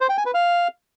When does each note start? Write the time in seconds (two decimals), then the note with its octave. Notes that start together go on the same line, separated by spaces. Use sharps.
0.01 C5
0.09 G5
0.17 G#5
0.26 B4
0.34 F5